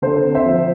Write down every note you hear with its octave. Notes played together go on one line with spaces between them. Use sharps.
D3 A4 C5
C4
C5 E5
F3